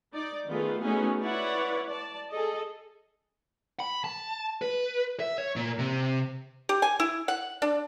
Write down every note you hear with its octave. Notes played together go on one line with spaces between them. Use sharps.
D#4 D5
D#3 A3 B3 F4 G#4 B4
A3 B3 C#4 D#4 F#4 G#4
E4 B4 C#5 D5 F#5
D5 A5
G#4 A4 D#5
B5
A5
B4
E5
C#5
A#2
C3
G4
G#5
E4
F#5
D4